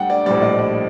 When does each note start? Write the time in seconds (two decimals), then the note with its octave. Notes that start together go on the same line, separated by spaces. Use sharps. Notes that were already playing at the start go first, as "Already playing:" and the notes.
Already playing: D2 D3 G3 F#5 G5
0.10 D5
0.26 A#1 A2 G3 D5
0.42 D#5
0.59 D5